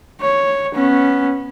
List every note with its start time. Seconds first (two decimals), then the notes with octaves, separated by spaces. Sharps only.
0.21 C#5
0.75 B3 C#4